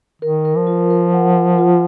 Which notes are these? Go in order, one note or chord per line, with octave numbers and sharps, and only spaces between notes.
D#3 A#4
A#4
F3
F4
A#4
F#5
F#5
F4